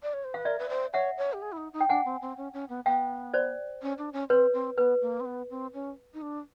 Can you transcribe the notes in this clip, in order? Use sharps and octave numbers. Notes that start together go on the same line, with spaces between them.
D5
C#5
C5
B4 F5
A#4 D5 E5
B4
C5
C#5 E5 F#5
C#5
G4
G#4
E4
D#4
D#4
G5
D4 F#5 G#5
C4
C4
C#4
C#4
B3
B3 F5 G5
C5 D5
C#4
D4
C#4
C4 B4 C#5
C4
B3 B4
A#3
C4
B3
C4
C#4
D#4
D4